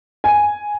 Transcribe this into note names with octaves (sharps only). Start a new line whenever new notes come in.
G#5